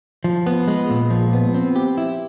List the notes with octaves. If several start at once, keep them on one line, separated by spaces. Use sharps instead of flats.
F3
B3
G#3
A#2
F3
B3
C4
G4
E4